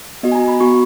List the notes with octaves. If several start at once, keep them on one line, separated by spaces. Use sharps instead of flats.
B3 F#4 D#5
G#5
A#5
B5
B3 F#4 C#6